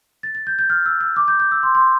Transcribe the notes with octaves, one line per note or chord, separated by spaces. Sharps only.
A6
A6
G6
G6
F6
E6
E6
D6
G6
G6
E6
C6
C6